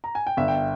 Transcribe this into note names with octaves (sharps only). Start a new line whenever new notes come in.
A#5
G#5
G5
G1 E5
G5
E5